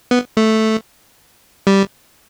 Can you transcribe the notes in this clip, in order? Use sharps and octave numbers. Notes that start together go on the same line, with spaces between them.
B3
A3
G3